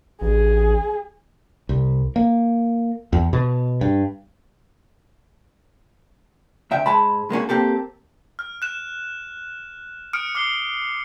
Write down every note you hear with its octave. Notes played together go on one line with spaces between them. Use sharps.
A1 G#4
C2
A#3
E2
B2
G2
D2 C#3 E5 G5
G#2 G#3 A5 B5
G#3 A#3 C#4 F#4
A#3 C4 G4 A4
F6
F#6 E7
D#6 F6 C#7 D7
D6 F6 C7 G7